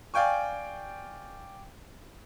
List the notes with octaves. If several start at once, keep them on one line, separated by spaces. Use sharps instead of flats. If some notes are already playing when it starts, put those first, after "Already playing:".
D5 F5 G5 G#5 C#6